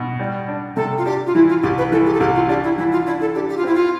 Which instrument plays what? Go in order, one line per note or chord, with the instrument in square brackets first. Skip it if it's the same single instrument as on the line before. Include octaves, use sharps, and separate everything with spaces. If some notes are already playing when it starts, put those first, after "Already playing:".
Already playing: [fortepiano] B2
G3
D4
[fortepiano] C3 [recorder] A4
[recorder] F4
[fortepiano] D4 [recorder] G4
[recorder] F4
[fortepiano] E3 [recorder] E4
[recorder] F4
[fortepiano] C2 [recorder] G4
[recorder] B4
[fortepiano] E3 [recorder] A4
[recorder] G4
A4
[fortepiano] C2 [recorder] G4
[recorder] F4
[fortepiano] D4 [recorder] G4
[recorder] E4
[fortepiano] E3 [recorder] E4
[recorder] F4
[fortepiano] D4 [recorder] E4
[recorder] A4
[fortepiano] D4 [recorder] G4
[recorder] G4
F4
[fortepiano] C4 [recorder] E4
[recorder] F4